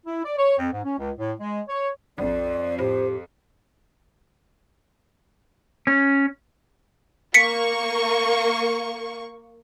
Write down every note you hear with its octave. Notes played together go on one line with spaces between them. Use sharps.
E4
D5
C#5
F2
G#2
C#4
C#2
A2
G#3
C#5
A#1 F2 D5
A2 G4 C5
C#4
A#3 C#6 B6 C#7